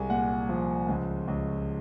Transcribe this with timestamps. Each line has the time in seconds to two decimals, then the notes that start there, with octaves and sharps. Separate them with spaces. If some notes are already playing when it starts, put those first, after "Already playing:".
Already playing: C2 G#3 G#5
0.10 A#2 F#5
0.49 F3
0.88 C#2
1.28 C#2